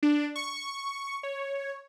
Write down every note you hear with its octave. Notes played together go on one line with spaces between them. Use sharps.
D4
C#6
C#5